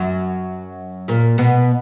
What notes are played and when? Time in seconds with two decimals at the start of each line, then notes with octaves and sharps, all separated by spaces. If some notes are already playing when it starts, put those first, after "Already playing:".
Already playing: F#2 F#3
1.08 A#2 A#3
1.38 B2 B3